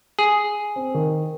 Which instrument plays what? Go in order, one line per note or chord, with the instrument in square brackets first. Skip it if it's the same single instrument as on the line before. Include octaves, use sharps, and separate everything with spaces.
[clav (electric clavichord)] G#4
[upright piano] C4
D#3